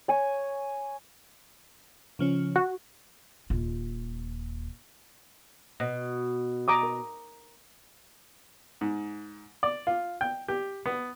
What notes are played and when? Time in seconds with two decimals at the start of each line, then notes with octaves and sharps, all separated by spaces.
0.08 C#5 G#5
2.19 C#3 F3 C#4
2.56 F#4
3.50 D#1 F4
5.80 B2
6.68 A#5 D6 D#6
6.83 A#4
8.81 G#2
9.63 D5
9.87 F4
10.21 G5
10.48 G4
10.86 B3